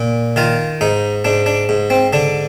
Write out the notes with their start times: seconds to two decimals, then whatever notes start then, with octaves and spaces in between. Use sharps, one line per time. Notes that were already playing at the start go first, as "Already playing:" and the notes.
Already playing: A#2
0.36 D#3 F4
0.81 G#2 D#4
1.25 G#2 D4
1.46 D4
1.69 G#2
1.90 C4
2.13 D3 D4